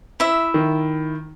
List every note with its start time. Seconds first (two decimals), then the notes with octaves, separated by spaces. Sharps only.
0.20 E4 E5
0.54 D#3